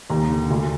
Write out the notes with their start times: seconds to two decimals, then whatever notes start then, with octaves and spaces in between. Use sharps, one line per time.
0.10 D#2 A#5
0.30 D3
0.50 D2